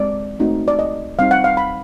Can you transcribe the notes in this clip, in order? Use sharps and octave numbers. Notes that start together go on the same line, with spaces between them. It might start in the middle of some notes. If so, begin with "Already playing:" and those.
Already playing: G#3 C4 D5
A3 C4 D#4 F#4
D5
D#5
G3 C4 D#4 F5
F#5
F5
B5